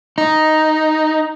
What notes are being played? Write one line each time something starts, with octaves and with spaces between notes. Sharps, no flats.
D#4